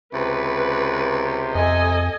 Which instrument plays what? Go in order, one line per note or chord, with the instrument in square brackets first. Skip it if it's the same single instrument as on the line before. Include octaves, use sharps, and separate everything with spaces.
[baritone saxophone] C#2 [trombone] C3 [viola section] B4
[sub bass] F2 [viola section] A4 D#5 G#5